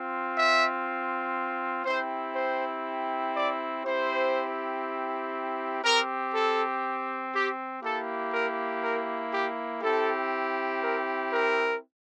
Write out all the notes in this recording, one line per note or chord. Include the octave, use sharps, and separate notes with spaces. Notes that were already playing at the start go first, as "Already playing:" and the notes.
Already playing: C4 F4
E5
C4 E4 G4 C5
C5
D5
C4 E4 G4 C5
C4 G4 A#4
A4
G4
A#3 E4 G4 A4
A#4
A#4
G4
C4 E4 G4 A4
A#4
A#4